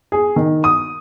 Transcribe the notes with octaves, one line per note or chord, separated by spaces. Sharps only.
G#4
D#3
D#6